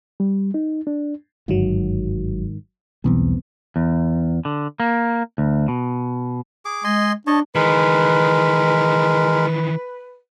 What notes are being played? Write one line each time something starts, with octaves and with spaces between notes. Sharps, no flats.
G3
D#4
D4
G1 G#2 D#3 F#3
B1 E2 G3 B3 C4
E2
D3
A#3
D2
B2
G#4 D6
G#3 D#5 G#5 C6
D4 C#5 D#5 A5
D#3 E3 G#3 A#4 B4